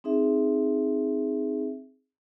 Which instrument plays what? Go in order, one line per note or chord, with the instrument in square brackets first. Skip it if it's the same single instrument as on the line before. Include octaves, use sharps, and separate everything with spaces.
[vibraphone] C4 D#4 G#4 E5